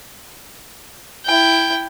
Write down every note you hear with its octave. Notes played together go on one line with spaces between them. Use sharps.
E4 G5